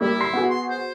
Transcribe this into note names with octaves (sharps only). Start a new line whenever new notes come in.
G3 A#3 E4
C6 C7
B3 F#4 G#4
C6
C5